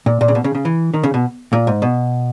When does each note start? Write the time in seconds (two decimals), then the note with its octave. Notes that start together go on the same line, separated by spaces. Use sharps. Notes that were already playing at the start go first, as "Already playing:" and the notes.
0.06 A#2
0.21 A#2
0.28 C#3
0.35 B2
0.44 C#3
0.55 C#3
0.65 E3
0.94 D#3
1.03 C#3
1.14 B2
1.53 A#2
1.67 G#2
1.82 B2